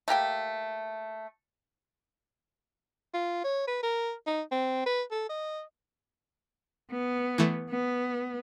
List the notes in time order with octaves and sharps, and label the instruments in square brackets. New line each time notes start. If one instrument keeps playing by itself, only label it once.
[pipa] A3 A#3 G4 G5
[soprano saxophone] F4
C#5
B4
A#4
D#4
C4
B4
A4
D#5
[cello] B3
[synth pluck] E3 A3
[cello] B3